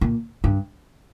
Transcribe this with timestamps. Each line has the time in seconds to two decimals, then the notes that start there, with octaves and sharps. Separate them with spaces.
0.01 A#2
0.44 G2